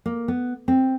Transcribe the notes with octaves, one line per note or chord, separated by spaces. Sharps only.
A#3
B3
C4